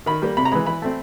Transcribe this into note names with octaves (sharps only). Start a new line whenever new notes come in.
D#3 B5
G3 A#3
C3 B5
A#5
E3 G#3 B5
E3 B5
A3 C4